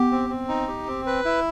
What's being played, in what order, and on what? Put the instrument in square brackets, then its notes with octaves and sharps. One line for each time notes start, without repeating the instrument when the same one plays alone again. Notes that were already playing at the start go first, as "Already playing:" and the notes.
Already playing: [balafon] B3 [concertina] G4
[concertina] C4
C4
D#4
G4
C4
B4
E4